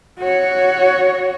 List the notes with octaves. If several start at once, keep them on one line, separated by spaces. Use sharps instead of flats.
F#4 C#5